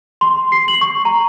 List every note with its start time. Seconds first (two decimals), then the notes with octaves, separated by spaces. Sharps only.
0.21 C6
0.52 C7
0.68 F#7
0.81 C#6
1.05 A#5